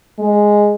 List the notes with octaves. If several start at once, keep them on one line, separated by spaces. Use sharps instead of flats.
G#3